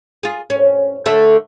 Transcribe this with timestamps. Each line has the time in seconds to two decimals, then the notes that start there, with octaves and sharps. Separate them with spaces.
0.23 F4 G#4
0.50 C#4
1.06 D3 A3 E5